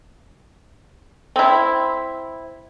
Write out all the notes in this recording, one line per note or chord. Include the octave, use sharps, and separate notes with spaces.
C4 E4